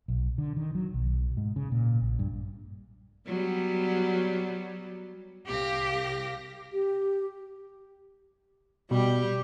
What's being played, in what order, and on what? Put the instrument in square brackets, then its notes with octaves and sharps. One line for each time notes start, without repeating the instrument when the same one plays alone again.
[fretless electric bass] B1
D3
D#3
F#3
B1
G#2
C#3
A#2
A#1
G2
[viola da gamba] F#3 G3 B3
[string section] C2 F5 A#6 [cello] G4
[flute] G4
[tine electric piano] B2 [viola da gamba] G3 G4